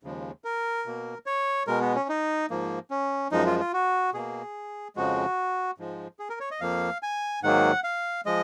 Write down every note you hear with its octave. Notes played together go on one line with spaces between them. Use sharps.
D#2 C#3 F3 G#3
A#4
B2 A#3
C#5
B2 G#3 A#4
B3
C#4
D#4
G#2 F3 A#3
C#4
F#2 F3 G#3 D#4
F4
F4
F#4
B2 A#3 G#4
F2 C#3 F3 G#3 F#4
G#2 F3 G#3
G#4
A#4
C#5
D#5
F2 F3 A#3 F5
G#5
G#2 D#3 F#3 A#3 F#5
F5
F3 G#3 D#5